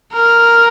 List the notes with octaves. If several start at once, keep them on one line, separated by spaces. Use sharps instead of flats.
A#4